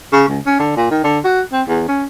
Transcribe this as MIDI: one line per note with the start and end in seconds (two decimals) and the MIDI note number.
0.13 0.27 49
0.28 0.40 37
0.46 0.56 61
0.59 0.73 50
0.77 0.90 46
0.91 1.02 51
1.04 1.19 50
1.24 1.42 66
1.53 1.62 60
1.68 1.87 40
1.88 2.05 61